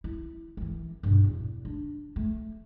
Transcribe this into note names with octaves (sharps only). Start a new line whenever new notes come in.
E4
E3 A#3
G2 B2
E2
D4
A3